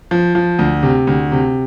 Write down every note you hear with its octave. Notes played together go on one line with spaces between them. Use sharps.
F3
F3
D2
C3
D2
C3